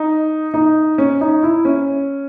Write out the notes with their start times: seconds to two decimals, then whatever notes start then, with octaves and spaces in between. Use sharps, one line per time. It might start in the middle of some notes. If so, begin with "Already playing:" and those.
Already playing: D#4
0.54 D#4
0.98 C#4
1.21 D#4
1.43 E4
1.65 C#4